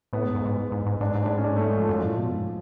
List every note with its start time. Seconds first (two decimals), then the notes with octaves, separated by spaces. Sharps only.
0.13 A2 B3
0.24 G#2
0.35 G#2
0.45 G#2
0.72 G#2
0.86 G#2
1.01 G#2 D4
1.15 G#2
1.23 A2 D4
1.30 G#2
1.38 A2 C#4
1.44 G#2 D4
1.56 A3
1.67 G#3
1.77 F3
1.88 F#2 F3
2.03 A2
2.18 B2
2.32 G#2